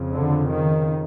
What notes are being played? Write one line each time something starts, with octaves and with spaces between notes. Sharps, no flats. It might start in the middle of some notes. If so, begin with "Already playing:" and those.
Already playing: F2 C#3
D3
D#3